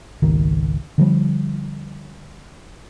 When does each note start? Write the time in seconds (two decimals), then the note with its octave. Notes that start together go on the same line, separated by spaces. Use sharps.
0.22 G#1 C#2 D#3
0.98 D3 F3 G3